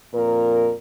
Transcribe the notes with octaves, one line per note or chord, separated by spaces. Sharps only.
F2 A#2 A#4